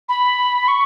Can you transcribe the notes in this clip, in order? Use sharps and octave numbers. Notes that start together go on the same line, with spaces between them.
B5
C#6